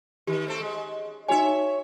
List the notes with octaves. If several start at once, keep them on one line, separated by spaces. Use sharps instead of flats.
D#3 G4
A3 C4 A4
G#3
D#4 F#4 C#5 E5 G#5